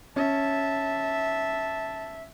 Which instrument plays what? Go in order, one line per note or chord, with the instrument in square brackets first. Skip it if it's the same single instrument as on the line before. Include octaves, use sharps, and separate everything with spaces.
[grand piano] C#4 C#5 [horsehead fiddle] E5 [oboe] A5